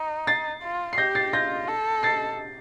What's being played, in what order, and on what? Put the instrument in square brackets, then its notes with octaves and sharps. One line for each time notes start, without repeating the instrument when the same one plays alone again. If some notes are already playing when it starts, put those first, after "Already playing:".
Already playing: [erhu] D#4
[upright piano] A6 C7
[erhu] F4
[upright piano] C7
[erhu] G4 [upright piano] G6 A#6
[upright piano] A6 C7
[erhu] F4 [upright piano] G6 A#6
[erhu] A4
[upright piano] A6 C7